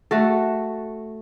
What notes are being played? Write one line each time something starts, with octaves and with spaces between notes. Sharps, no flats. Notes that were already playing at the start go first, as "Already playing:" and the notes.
A3 F#4 A4